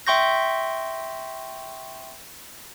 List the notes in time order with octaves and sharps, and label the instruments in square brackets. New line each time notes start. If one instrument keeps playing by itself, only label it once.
[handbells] E5 G5 C6 C#6 G6 A#6